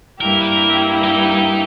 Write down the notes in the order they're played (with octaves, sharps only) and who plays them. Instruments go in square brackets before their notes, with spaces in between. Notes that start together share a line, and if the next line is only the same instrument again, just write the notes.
[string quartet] G2 G3 A#3 E4 G4 [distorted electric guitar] A#4
[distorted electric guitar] B4
A#4
D#4
D#4